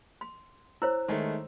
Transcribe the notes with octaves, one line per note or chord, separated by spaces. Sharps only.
C6
E4 C5 C#5 E6
D#3 G#3 A3